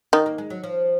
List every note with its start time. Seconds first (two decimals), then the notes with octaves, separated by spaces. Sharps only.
0.13 D#3 D#4
0.26 A#3
0.38 G#3
0.50 F#3
0.63 F3